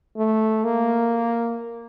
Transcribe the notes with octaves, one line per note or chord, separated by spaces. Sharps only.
A3
A#3